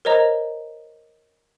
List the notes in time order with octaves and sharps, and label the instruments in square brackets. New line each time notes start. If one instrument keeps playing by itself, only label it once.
[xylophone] A#4 C5 C#5 D#5 A#5